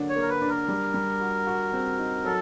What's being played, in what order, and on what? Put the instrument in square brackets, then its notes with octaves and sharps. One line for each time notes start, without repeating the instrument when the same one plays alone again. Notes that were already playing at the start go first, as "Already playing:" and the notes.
Already playing: [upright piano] D3 F#3 A#3 D4
[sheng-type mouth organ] C#5
[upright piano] A#3
[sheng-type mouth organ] A#4
B4
[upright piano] D4
[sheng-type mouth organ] A#4
[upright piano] G3
G3
F#4
F#4
C4
D#4
[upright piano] F#3 [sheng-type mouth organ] A4